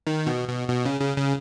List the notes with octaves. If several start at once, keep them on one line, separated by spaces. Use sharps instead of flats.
D#3
B2
B2
B2
C#3
C#3
C#3